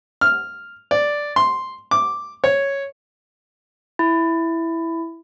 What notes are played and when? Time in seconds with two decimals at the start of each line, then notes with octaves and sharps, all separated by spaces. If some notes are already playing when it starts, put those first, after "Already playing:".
0.21 F6
0.91 D5
1.36 C6
1.91 D6
2.44 C#5
3.99 E4